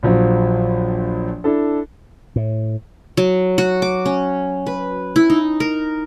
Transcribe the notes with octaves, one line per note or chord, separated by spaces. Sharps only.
A#1 F3 F#3
D4 E4 A4
A2
F#3
F#4
D6
C#4
B4
E4
D#4
A#4